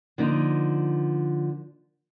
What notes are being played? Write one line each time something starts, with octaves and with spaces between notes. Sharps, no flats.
D3 F3 A#3 D#4